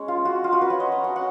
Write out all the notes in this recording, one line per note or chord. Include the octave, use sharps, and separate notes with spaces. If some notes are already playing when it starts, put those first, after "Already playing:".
Already playing: G#3 C#4 C#5
F4
F#4
F4
F#4
B4
C#5
D#5
A#5
G#5
F#5